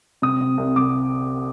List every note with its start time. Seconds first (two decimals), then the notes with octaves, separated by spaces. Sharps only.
0.22 C3 D#6
0.41 C3
0.58 C2
0.76 C2 D6